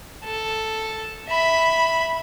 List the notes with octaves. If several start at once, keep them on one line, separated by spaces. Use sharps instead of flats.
A4
E5 B5